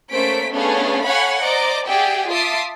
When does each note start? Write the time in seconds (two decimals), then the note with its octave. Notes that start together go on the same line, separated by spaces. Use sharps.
0.11 A3 A#3 C#4 C5 B6 D7
0.51 A3 B3 C#4 D4 G#4 F5
1.05 A4 C#5 F5 F#5 G#5 B5
1.42 C5 D5 D#5 A#5 D6
1.86 G4 G#4 D5 E5 F#5 G5
2.29 F4 E5 A5 D6 D#6 C7